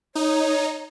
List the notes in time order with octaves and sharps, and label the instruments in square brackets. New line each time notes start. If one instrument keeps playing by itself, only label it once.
[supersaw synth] D#4 [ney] C#5